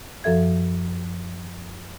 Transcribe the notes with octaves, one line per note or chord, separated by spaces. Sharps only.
F#2 F3 A4 E5 G#6